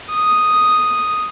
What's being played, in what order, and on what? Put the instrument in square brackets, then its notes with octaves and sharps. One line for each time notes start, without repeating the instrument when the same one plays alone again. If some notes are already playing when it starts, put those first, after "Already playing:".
[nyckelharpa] D#6